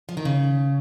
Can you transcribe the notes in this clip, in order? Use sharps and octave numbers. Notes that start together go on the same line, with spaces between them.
F3
D#3
C#3